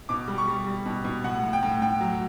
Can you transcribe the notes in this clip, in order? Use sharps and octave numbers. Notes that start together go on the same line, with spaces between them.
B2 D6
G3
C#6
G3
G3
B2
B2
A2 F#5
A2
G5
A2
A2 G5
F#3